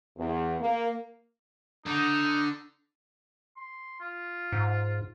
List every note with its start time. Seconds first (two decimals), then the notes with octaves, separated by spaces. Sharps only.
0.17 E2
0.60 A#3
1.86 D3 D#4
3.57 C6
4.00 F4
4.52 G#2